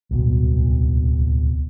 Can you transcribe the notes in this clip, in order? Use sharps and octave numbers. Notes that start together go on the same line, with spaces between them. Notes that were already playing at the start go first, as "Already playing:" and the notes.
D1 C2 B2